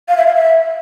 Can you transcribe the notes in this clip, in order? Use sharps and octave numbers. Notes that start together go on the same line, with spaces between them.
F5
E5
F5
E5